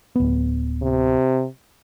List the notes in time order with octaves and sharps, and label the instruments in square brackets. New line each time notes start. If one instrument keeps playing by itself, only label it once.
[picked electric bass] D1 B3
[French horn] C3